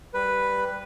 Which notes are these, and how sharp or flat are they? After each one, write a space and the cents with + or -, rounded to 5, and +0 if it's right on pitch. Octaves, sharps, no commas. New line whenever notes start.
G3 +0 B4 +0